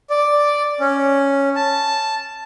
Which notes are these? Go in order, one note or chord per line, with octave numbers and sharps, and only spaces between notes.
D5
C#4
A5